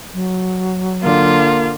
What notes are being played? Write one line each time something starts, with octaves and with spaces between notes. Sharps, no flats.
F#3
D3 A#3 F4